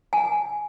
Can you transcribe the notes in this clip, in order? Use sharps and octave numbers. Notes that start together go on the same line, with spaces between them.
G#5